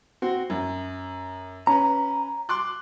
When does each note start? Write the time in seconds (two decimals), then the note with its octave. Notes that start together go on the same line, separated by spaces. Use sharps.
0.22 C4 F#4
0.50 F#2
1.67 C#4 B4 A#5
2.49 C6 D6 F#6